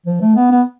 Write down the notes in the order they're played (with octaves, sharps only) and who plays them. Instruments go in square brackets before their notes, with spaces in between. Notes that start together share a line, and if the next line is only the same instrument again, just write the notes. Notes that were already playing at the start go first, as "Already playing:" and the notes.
[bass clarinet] F3
A3
B3
B3